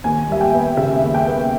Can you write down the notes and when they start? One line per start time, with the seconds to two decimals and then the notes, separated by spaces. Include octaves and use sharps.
0.04 D#2 G#5
0.28 G3 E5
0.41 G5
0.53 B3
0.77 C#3 E5
1.02 D#2
1.14 G5
1.26 B3